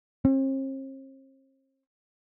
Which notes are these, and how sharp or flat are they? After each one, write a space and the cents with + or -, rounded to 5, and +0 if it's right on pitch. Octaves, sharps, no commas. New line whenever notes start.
C4 +45